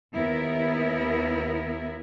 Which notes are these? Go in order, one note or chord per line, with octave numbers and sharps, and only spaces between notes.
D#2 B3 E4 A#4